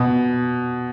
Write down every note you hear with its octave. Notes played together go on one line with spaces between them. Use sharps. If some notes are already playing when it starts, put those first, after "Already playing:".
Already playing: B2